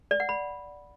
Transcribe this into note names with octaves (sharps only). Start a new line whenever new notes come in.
D5
F#5
B5